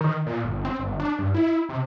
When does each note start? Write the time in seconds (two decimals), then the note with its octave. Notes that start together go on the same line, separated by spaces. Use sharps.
0.01 D#3
0.26 A#2
0.44 G1
0.65 C4
0.79 G1
1.00 D4
1.19 G2
1.34 E4
1.69 C3